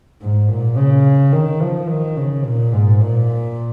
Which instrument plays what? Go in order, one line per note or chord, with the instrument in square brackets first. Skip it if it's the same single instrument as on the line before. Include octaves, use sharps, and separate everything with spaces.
[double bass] G#2
A#2
C#3
D#3
F3
D#3
C#3
A#2
G#2
A#2